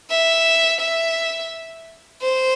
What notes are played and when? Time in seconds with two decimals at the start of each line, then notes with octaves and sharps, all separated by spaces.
0.11 E5
0.81 E5
2.22 C5